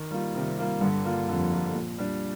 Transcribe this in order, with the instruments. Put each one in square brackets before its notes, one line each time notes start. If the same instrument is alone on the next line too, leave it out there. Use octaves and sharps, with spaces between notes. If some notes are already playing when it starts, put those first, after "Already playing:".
Already playing: [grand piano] D#3
G3 A#3 F4
[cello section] C3 [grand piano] D#3
[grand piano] G3 A#3 F4
[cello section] G2 [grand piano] D3
[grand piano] G3 A#3 F4
[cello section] F2 [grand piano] D3
[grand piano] G3 A#3 F4
A#2
G3 D4